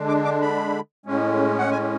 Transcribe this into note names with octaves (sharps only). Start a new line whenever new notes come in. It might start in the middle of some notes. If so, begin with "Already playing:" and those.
Already playing: D3 G#3 D4
D6
D6
B5
A2 G#3 C#4
F#5
G#5